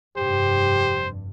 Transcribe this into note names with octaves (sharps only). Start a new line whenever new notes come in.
F1 G2 G4 C5